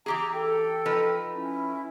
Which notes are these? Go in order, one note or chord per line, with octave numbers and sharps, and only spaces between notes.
E3 G4 G#4 A#5
A4 G5
F3 D#4 B4
C#4 E4